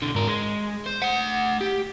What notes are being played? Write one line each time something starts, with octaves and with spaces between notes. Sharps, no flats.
B1 D3
G#2 A#4
G#3
C5
A3 F#5
G4